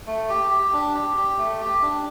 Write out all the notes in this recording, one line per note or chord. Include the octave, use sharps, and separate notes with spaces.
A3
G4
G4
D4
G4
G4
A3
G4
D4